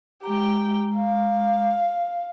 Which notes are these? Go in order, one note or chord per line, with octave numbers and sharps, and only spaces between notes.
G#3 G4 G5 A#5
F5